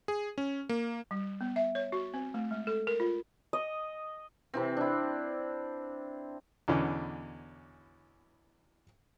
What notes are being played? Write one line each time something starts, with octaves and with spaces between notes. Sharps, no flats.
G#4
C#4
A#3
G3
B3
E5
C#5
F#4
C4
A3
G#3
A4
A#4
F4
D#5
C3 E3 C4
D4 E4
E2 B2 D3 E3 C#4